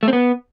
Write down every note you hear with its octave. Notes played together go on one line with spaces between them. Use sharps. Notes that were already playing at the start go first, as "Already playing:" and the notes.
A3
C4
B3